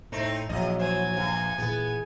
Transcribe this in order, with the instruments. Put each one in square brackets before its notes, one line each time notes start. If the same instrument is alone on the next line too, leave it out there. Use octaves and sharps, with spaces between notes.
[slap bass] A2 [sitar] A3 C4 D#4
[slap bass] A#1 [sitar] E2 D#5 [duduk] F#3
[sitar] E3 C5 [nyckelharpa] G#5
[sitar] E2 G2
[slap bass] A#2 E3 [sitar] B3 [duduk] G#4